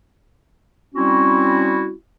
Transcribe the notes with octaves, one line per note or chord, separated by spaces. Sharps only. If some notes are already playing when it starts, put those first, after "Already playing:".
G3 C4 C#4 E4 F#4